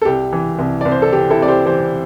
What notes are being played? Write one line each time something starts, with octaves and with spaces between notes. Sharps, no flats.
A4
C2 G4
E3
C2
C2 D5
C5
A4
E3 G4
E4 A4
C3 D5
G4 C5
E3 G4 C5